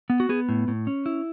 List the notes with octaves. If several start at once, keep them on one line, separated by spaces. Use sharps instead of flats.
B3
F#4
B3 G#4
A2
A2
C#4
E4